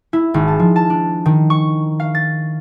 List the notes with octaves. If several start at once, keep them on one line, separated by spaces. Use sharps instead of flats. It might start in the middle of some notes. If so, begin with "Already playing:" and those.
E4
G#1
A5
F3
A5
D4
D#3
C#6
F5
A6